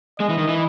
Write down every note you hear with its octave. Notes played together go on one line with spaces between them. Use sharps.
G#3 D#5
E3
D#3
E3